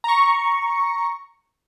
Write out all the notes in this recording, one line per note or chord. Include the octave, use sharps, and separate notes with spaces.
A#5 C#6